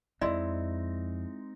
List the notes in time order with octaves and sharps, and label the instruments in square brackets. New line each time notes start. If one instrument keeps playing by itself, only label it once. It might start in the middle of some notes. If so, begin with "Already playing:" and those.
[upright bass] F2 [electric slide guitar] G#3 C4 D#4 [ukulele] E4 [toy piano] D5 D#5 C6